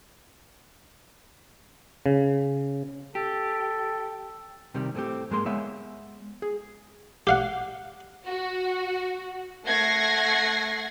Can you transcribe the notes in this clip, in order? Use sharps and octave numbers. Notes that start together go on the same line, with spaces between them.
C#3
G4 A4
C3 D#3 G3
A2 A3 C4 G4
G#2 G#3 A#3 C6
G#3 B3 C#5 E5 F5
G#4
G4 F5 F#5
F#4
A3 F#5 G#6 A#6 C7